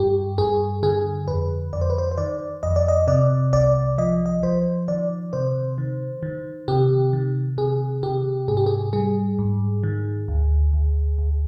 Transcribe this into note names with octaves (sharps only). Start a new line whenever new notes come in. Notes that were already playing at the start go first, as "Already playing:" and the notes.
Already playing: G2 G4
G2 G#4
D3 G#4
F2 B4
F2 D5
C5
B4
C5
C5
D#3 D5
F2 D#5
D5
D#5
C3 D5
C2 D5
F3 D#5
D#5
F3 C5
D#3 D5
C3 C5
D#3
D#3
C3 G4
D#3
C3 G#4
C3 G4
G#2 G#4
G4
G#4
G3 G#4
G#2
D#3
D2
D2
D2